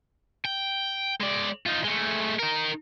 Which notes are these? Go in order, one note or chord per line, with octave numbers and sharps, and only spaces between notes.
G5
G#3 D5
D#4 F4
G#3 A3
D#4 A#4